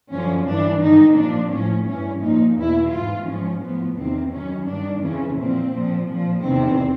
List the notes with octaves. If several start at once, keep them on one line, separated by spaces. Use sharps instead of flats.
F#2 D3 F3 C#4
G2 E3 D4
G#2 D#3 D#4
A#2 F3 D4
A2 F3 C#4
G2 E3 C#4
A#2 F3 D#4
E2 B2 E4
G#2 E3 F4
G#2 F3 C#4
A2 F3 B3
E2 C3 D#3 C4
F#2 D#3 C#4
G2 D#3 D4
F2 C#3 E3 C#4
A#2 F3 C4
A#2 F3
A#2 F3
E2 C3 D#3 C4